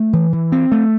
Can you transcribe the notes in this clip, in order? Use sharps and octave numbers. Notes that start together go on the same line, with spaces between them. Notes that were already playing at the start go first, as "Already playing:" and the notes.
Already playing: A3
E3
E3
C4
A3